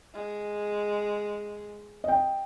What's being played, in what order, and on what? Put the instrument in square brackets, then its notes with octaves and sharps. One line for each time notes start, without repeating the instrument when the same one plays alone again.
[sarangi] G#3
[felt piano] D#5 G5